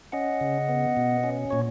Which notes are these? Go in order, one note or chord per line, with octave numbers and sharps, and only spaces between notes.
C#4 D#5 F#5
C#3
B3
B2
C#4
A#2 C#5